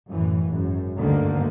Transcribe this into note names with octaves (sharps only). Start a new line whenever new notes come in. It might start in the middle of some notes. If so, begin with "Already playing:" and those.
F#2 A2 E3
G#1 F#2
D2 G2 D3 D#3 A#3